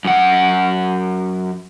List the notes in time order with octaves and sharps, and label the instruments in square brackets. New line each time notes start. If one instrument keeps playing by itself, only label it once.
[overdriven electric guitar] F#2 F#5